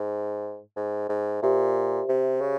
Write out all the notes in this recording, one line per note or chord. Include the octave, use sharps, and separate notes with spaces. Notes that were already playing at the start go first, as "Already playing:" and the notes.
Already playing: G#2
G#2
G#2
A#2 G4 C5 E5
C3
C#3